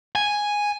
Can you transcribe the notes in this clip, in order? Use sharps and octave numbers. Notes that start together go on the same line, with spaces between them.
G#5